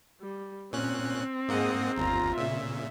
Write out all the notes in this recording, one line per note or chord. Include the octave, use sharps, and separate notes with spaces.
G3
A#2 C4 C#4 F#6
G#2 A#3 G#4 D#5 F#5
G1 D#2 F4 A#5
A#2 C#3 E5